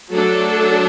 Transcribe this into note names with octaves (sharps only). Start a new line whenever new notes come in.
F#3 A3 D4 A4